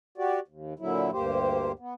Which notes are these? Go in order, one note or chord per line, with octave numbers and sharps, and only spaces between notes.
F#4 G4 D5
D#2
A#2 D3 F#3 E4
D2 G2 A#3 G4 C5
B3